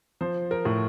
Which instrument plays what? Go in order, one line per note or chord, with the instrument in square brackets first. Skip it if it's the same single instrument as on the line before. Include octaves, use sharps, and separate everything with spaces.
[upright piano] F3 C5
A#4
A2